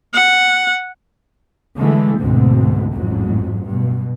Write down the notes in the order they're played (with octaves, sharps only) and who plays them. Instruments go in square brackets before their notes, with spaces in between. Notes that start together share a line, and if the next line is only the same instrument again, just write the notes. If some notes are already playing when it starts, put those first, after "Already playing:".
[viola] F#5
[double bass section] D3 E3 G#3 A3
D2 G#2 B2 D3 C4
A1 F2 G#2 F#3
G2 B2